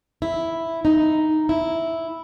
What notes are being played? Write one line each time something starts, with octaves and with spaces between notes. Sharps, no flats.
E4
D#4
E4